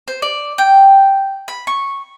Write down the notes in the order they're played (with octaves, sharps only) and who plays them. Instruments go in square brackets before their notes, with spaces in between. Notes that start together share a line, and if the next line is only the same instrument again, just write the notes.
[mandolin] C5
D5
G5
B5
C#6